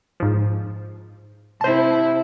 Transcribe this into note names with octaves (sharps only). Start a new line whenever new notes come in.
G#2 F3
C3 E4 C5 A5